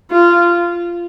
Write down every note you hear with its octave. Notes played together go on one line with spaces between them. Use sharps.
F4